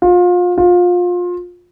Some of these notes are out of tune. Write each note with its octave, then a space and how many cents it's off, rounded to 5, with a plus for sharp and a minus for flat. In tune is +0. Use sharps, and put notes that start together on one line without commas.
F4 +30
F4 +25